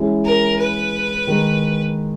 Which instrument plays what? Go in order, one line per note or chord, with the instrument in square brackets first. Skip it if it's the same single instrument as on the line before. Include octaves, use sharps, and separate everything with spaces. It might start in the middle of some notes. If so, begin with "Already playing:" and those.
Already playing: [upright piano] E3 G#3 C#4 E4 G#4
[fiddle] A#4
B4
[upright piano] D#3 G#3 D#4